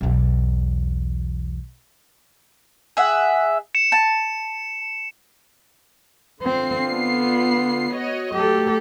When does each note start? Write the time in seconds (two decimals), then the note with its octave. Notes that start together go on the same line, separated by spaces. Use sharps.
0.01 B1 E2
2.97 G#4 E5 F#5
3.75 C#7 E7
3.92 A5
6.43 D3 C4 F4 C7
6.90 B3
7.92 F#4 C#5 D#5
8.34 F#3 A3 G4 A4